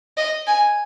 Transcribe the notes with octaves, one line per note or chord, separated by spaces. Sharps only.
D#5
G#5